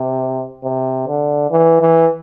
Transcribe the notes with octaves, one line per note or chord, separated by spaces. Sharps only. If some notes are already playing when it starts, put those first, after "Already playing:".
Already playing: C3
C3
D3
E3
E3